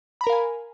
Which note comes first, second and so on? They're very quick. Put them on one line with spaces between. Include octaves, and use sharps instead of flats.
B5 A#5 A#4 F5 G#5